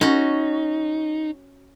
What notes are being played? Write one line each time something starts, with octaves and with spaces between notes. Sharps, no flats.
C#4 D#4 F#4